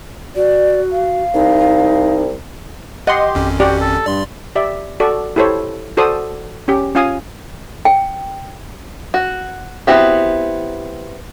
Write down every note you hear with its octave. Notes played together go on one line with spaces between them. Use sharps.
F#4 D5
F5
C2 D#4
G4 D#5 F#5 C6
G#1 F2 C#4
F#4 G4 D5 F#5
A4
G2 D5 C6
G4 D5 E5
F#4 A4 D5 C#6
E4 G4 A4 C5 C#5
F#4 A4 C5 D5 D#6
C#4 G4
C#4 F4 F5 G#5 D#6
G5
F#4
B3 C4 E4 F#4 G4